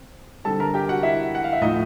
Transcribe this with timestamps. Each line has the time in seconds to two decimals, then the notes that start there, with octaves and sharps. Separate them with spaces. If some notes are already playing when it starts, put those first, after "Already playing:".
Already playing: C4
0.44 D3 G3 C4 A4 A5
0.60 A#4 A#5
0.74 G4 G5
0.89 F#4 F#5
1.03 E4 E5
1.35 F#5
1.44 F5
1.53 E5
1.61 A2 F3 A3 D#4 D#5